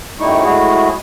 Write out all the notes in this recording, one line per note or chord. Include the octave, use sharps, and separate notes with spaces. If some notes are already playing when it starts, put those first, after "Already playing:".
F#2 G3 A3 D#4 E4 C#6
A2 G#3 A3 E4 F#4 G#4